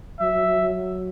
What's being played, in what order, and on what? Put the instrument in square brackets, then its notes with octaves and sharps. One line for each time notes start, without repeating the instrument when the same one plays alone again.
[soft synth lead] F#3 [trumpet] E5
[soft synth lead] F#3
F#3
F#3
F#3